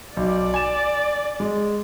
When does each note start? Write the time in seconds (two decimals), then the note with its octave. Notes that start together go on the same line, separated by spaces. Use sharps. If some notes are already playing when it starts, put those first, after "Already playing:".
0.17 B1 D5
0.54 G#5 E7
1.40 G#3